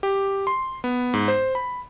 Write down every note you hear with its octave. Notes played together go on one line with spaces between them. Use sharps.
G4
C6
B3
G#2
C5
B5